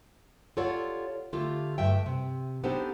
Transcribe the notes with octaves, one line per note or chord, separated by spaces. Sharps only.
F4 G4 A4 C#5 D5 F#5
D3 A3 F4 G4 A4
G2 A3 E5 G5
C3
B3 D4 D#4 G4 A4 C5